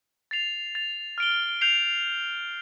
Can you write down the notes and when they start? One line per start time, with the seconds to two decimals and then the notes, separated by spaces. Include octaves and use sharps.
0.31 A6 C7 F7
0.75 A6 F7
1.18 F6 D7 G7
1.61 G6 C7 F7